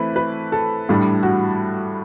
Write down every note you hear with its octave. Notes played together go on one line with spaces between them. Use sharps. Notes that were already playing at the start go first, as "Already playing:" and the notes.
Already playing: E3 A3 C4 E4 B4
B4
A4
A2 G3 D4
F#4